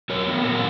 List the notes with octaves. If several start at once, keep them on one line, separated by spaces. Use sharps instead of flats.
F#3 A#4 C#5
B3
A#2 F#4 A#4